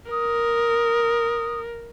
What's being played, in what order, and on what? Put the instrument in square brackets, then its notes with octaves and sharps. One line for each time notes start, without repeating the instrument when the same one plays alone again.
[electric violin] A#4 [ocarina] D#6